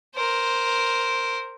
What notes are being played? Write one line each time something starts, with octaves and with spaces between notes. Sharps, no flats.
A#4 C5